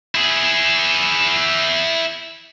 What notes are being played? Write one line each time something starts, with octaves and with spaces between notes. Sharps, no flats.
E4 G#4